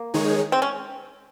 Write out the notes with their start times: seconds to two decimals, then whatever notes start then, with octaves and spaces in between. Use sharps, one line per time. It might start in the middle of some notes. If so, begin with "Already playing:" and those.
Already playing: A#3
0.14 D#3 G#3 D#4 G#4 C#5
0.52 C4
0.62 C#4